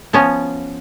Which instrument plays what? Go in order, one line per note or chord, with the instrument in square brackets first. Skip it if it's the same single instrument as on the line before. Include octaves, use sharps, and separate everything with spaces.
[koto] F3 B3 C#4